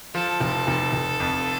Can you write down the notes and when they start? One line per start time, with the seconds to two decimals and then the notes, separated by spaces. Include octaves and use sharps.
0.14 F3 A4
0.40 F1
0.67 F1
0.93 F1
1.20 F2